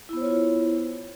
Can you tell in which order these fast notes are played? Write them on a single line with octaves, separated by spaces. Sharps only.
E4 B3 C5 C#5 F4